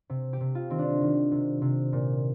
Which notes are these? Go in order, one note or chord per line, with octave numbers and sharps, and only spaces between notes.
C3
G4
C3
F4
D#3 C4
D4
D#3
C3
C3
A#2